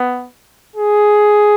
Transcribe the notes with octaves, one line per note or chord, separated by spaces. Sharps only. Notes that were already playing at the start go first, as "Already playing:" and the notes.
Already playing: B3
G#4